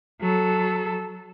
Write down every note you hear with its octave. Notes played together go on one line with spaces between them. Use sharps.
F#3 A4